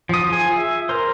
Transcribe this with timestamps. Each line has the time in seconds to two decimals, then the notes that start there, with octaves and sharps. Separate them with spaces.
0.09 F3 D#6
0.30 F4 G#4 G#5
0.56 E5
0.89 A#4 C5